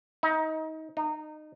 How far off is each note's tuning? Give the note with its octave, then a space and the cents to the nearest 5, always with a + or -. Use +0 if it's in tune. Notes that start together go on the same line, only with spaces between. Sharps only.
D#4 +25
D#4 -25